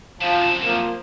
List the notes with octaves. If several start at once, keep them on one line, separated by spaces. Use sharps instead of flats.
F#2 C3 F3 E7
F3 A#3